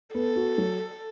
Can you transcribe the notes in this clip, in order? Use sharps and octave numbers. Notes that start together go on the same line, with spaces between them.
B3 A4
F#4
F#3